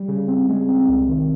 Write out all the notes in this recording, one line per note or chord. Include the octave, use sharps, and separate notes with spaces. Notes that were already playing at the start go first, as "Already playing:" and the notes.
Already playing: G3
C#3
C4
G#3
C4
C2
D#3